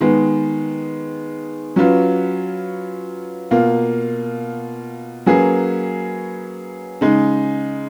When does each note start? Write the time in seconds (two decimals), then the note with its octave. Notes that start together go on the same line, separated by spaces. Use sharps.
0.01 D#3 G#3 B3
1.76 F#3 C#4 F4 B4
3.51 B2 A#3 F4
5.26 F#3 A#3 C#4 G#4 B4
7.01 C#3 G#3 D#4